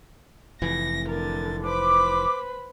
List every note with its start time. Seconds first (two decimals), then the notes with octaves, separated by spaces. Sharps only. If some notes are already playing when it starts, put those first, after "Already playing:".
0.62 F1 E3 A#6
1.07 D3 A#4 A6
1.62 B4 C5 B5 D6